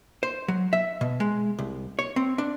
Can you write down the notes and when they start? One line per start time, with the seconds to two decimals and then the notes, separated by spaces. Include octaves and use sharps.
0.23 C5
0.48 F#3
0.73 E5
1.01 B2
1.20 G#3
1.58 C2
1.99 C#5
2.16 C4
2.38 D4